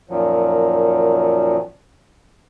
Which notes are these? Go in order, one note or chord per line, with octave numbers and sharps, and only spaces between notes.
F#2 A#2 D#3 F3 F#3